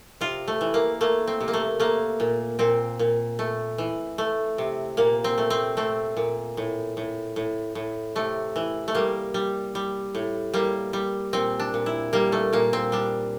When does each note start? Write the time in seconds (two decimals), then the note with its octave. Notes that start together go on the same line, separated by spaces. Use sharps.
0.21 C3 F4
0.48 A3
0.61 E3
0.74 A#3
1.01 A3 A#3
1.27 C4
1.41 C3
1.48 A#3
1.53 A3
1.80 A3 A#3
2.20 A#2
2.59 A#2 C4
2.99 A#2
3.39 A3
3.78 E3
4.18 A3
4.58 C3
4.97 A#2 A#3
5.24 C4
5.38 A3
5.50 C4
5.77 A3 C4
6.17 A#2
6.57 A2
6.97 A2
7.36 A2
7.75 A2
8.15 C3 A3
8.56 E3
8.88 A3
8.95 G3 A#3
9.34 G3
9.75 G3
10.15 A2
10.54 G3 A#3
10.93 G3
11.33 A#2 C4
11.60 D4
11.74 A#2
11.86 E4
12.13 G3 A#3
12.32 A3
12.53 A#2 A#3
12.73 C4
12.92 G3 D4